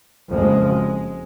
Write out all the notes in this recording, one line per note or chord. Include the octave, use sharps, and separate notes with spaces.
F#1 F2 G#3